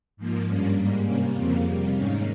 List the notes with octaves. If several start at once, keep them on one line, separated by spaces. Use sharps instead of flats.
G#2 F3 A#3
G2 G3 A#3 C#4
G#2 G3 A#3
C3 G3 A#3 C#4
F2 C#3 F3 A#3 C4
C3 G3 A#3
G#2 D#3 A#3 C#4